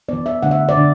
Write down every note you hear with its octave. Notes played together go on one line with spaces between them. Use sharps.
E3 B3 D5
E5
D3 A3 F#5
E5
D5
D3